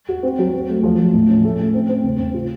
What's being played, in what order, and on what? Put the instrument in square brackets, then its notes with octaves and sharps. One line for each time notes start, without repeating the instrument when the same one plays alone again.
[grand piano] F#4
C4
F#3
C4
A3
F3
F3
A2
C#4
A3
A3
C4
C4
C#3
C#3
F4